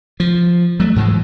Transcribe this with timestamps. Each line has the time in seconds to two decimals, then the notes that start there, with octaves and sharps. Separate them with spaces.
0.20 F3
0.80 F#3 A3
0.96 G#2 E3 F#3 G#3